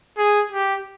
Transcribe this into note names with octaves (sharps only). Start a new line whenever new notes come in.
G#4
G4